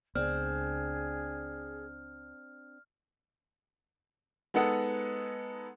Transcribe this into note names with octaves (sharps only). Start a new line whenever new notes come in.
C#2 B3 C4 D4 G#4 F6
G#3 B3 D#4 A4 F#5